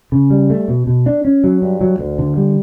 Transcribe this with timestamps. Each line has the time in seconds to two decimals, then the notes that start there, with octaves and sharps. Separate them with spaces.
0.12 C#3
0.30 G3
0.50 A3
0.68 B2
0.87 B2
1.06 D4
1.25 C#4
1.44 F#3
1.62 G2
1.81 F#3
1.99 D2
2.19 D3
2.37 G3